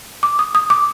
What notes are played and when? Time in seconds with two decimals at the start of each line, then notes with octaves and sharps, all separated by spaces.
0.23 D6
0.39 D#6
0.55 D#6
0.70 D6